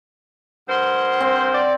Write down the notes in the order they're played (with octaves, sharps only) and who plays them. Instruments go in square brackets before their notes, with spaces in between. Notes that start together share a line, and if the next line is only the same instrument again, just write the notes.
[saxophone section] G2 A#4 C5 [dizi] F#5
[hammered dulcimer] C4
[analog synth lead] D5